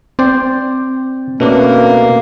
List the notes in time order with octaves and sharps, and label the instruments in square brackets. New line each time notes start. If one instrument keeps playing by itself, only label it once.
[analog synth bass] C4 [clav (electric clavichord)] C5 D5 G5
[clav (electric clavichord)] B2 A3 D4 [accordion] A#3 [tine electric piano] C#4 A4 B4